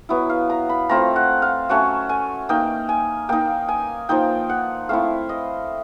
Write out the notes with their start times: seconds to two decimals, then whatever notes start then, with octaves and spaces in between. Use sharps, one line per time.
0.09 F#3 B3 E4
0.30 F5
0.50 A#5
0.69 B5
0.89 A3 C4 F4 A#5
1.16 F#5
1.42 F5
1.69 F#3 A3 C#4 F#5
2.09 G#5
2.49 A#3 D#4 G5
2.89 G#5
3.29 A#3 D#4 G5
3.69 G#5
4.09 F3 A#3 D#4 G5
4.49 F#5
4.89 A3 C4 E4 F5
5.29 D#5